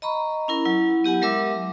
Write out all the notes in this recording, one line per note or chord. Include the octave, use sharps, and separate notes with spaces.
D#5 A#5 B5 C#6
C#4 E4 A#4
F#3 E4
B3 G4 F#5 G#5
F#3 G#3 A#4 E5 D6 E6